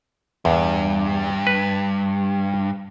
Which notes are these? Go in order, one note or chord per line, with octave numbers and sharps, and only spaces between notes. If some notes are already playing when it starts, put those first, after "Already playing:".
E2 G2
B4